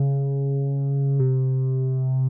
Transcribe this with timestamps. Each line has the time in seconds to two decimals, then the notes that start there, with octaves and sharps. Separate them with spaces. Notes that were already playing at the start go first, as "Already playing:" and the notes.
Already playing: C#3
1.19 C3